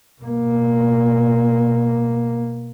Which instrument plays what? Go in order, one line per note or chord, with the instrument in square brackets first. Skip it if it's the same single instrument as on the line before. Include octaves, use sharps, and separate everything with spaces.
[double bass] B2 A#3